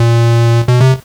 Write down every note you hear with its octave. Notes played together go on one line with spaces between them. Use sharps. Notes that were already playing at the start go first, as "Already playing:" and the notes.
Already playing: A#2
B2
C3